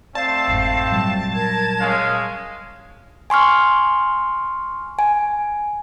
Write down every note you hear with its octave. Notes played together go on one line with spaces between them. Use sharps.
A3 C4 D5 F5 A5
G1 F2 G#2
A#2 F#3 G3
A#4 G#6
G#3 C#4 F5
G#5 C6 C#6 F6
G#5